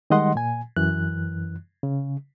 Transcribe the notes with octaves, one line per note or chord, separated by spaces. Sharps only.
D#3 G3 G#3 D#5 F#5 C6
A#2 G#5
F#2 E3 F#6
C#3